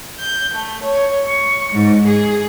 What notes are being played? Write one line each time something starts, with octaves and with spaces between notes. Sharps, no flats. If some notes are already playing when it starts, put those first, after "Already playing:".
G6
A3
C#5
C#6
G#2
G#4